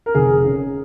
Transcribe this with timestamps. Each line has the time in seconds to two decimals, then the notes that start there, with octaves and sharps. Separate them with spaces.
0.06 A#4
0.15 F1 G#4
0.44 C#3